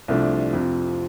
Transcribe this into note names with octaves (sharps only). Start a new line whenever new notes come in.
C2 C3 F3 A3 D4
F2 C3 F3